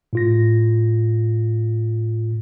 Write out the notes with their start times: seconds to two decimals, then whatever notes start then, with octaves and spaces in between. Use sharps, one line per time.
0.13 A2 F4 A#6